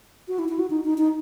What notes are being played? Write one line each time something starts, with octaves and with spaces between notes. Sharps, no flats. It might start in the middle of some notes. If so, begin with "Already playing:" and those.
F#4
E4
E4
F#4
D#4
D#4
D#4